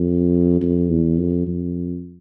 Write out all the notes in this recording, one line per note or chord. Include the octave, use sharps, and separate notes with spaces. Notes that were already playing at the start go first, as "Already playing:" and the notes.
Already playing: F2
F2
E2
F2
F2